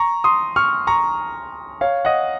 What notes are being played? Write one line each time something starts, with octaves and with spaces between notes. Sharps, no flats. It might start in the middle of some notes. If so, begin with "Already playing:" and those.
Already playing: A#5 C#6
C6 D#6
C#6 F6
A#5 C#6
C#5 F5
D#5 F#5